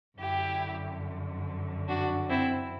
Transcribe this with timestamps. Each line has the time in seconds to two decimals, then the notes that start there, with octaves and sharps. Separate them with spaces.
0.19 F#2 D3 E4 G4
1.88 D4 F#4
2.29 C4 E4